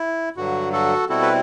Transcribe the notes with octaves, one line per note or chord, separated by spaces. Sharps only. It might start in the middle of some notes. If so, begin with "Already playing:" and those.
Already playing: E4
G2 D3 F#3 F#4
F#4 A4
B2 G3 C4 E4 F#4 A4
B4